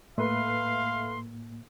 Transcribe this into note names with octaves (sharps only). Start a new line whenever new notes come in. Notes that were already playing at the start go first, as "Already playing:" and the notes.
A2 A3 A#3 B4 F5 C6